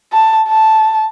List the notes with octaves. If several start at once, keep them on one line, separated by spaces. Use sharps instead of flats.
A5
A5